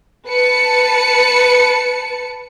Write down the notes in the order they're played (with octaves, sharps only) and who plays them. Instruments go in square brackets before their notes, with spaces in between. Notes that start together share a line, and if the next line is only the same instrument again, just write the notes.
[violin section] B4 A5 C#7